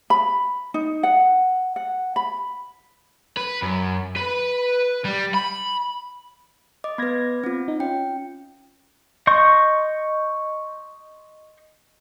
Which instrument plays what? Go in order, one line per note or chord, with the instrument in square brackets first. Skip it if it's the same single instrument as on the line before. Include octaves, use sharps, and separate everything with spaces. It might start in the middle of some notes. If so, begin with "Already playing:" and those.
[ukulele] B5
D#4
F#5
F#5
B5
[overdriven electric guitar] B4
F#2
B4
G3
B5
[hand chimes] D#5 D6
[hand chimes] B3 B4 [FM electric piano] B5 G#6 A#6
[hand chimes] C4 F4
[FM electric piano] D#4
[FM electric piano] C#4 F4 [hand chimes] G5
[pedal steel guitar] D#5 C6 C#6 G6